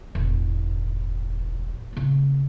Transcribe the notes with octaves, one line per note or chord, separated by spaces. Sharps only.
E1 A1
C#3 A#3